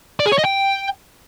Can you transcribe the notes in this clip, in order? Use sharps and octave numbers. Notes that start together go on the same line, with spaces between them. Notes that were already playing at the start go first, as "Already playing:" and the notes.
D5
G#4
C#5
D#5
G5